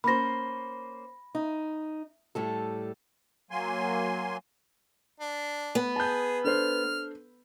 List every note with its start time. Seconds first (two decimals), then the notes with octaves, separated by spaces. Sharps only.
0.04 A#3 C#4 C5 B5 A#6
1.35 D#4
2.35 A2 G3 A4
3.51 F#3 A#3 G#5 C6
5.20 D4
5.75 B3
5.96 G#4 A5 G6
6.44 D4 A4 C5 F6